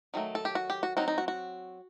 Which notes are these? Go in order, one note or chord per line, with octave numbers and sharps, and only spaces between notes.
D#3 F#3 A3
A4
G4
F#4
G4
F#4
F#3 C4 D#4 F#4
D#4
F#4
F#4